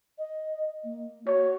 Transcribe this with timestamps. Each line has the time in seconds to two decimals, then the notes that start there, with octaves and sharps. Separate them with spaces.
0.18 D#5
0.84 A#3
1.27 F#4 C#5